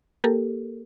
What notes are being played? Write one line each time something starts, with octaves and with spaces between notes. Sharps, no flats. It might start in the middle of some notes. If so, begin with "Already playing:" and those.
A#3 G4 A4 A#4